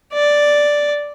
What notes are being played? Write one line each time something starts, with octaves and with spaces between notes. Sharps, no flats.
D5